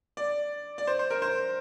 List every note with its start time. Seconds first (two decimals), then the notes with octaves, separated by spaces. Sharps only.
0.17 D5
0.78 D5
0.87 C5
0.99 C5
1.10 A#4
1.22 C5